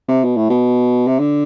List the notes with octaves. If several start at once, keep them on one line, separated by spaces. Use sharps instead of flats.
C3
B2
A2
B2
C3
D3